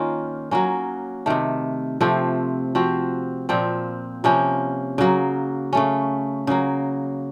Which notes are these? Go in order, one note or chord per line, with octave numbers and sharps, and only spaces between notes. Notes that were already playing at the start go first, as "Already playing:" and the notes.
Already playing: D#3 A#3 C#4 F4
F#3 A#3 C#4
C3 D#3 A3
C3 F3 A3 C4
F3 C4 F#4
A#2 F3 C4
C3 F3 A#3 C#4
C#3 F#3 A#3
C#3 A3 C#4
C#3 F#3 A#3